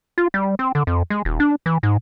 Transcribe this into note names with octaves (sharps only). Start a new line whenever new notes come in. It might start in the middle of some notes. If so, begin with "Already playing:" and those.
F4
G3
C4
D3
F2
G#3
D#1
D4
E3
G#2